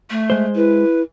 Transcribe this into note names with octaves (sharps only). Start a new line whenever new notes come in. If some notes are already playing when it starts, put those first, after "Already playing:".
A3
G#3 C5
E4 B4